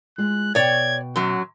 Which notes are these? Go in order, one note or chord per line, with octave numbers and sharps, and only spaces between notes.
G#3 F4 F#6
B2 C#5 D5 G5 G#6
F#2 F#3 F#5